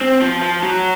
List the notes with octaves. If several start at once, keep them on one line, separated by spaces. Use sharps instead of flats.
C4
F3
F3
F#3